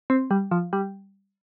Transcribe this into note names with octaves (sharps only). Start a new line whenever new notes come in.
C4
G3
F3
G3